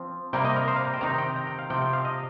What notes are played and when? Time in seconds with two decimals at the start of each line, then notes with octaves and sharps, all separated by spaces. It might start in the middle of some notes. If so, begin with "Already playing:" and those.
Already playing: F3 C4
0.33 C3 G3 A#3 G5
0.45 D#5
0.56 A#4
0.68 C5
0.76 F5
0.85 A#5
0.94 G5
1.01 C3 D#3 C4 D#4 A#5
1.18 G5
1.36 A#5
1.47 G5
1.59 F5
1.70 C3 F3 C4 G5
1.82 G5
1.93 F5
2.05 D#5